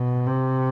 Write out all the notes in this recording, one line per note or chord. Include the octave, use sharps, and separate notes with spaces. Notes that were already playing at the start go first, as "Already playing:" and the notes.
Already playing: B2
C3